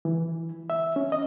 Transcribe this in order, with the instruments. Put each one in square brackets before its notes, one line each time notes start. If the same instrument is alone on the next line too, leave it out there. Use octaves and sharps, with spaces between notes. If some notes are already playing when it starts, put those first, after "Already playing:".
[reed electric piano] E3
E5
C#4
D#5